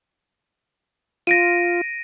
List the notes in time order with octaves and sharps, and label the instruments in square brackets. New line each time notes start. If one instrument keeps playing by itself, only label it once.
[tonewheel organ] F4 [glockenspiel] A#6 D7 D#7